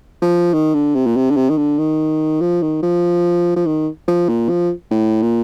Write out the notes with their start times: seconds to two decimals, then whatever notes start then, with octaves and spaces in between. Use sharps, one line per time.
0.22 F3
0.54 D#3
0.74 D3
0.95 C3
1.06 A#2
1.16 C3
1.30 D3
1.36 C3
1.49 D#3
1.57 D3
1.79 D#3
2.41 F3
2.62 D#3
2.83 F3
3.56 F3
3.66 D#3
4.08 F3
4.29 A#2
4.49 F3
4.91 A2
5.22 A#2